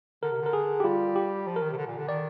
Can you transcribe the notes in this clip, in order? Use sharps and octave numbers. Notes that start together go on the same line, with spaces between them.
D3 A#4
C3
D3 A#4
G#4
G4
G3 F4
G4
F3
A#4
D#3
C3
D3
A#2
D3
D#3 D5